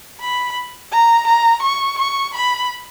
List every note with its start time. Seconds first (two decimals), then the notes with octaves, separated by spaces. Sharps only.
0.20 B5
0.92 A#5
1.27 A#5
1.62 C#6
1.99 C#6
2.34 B5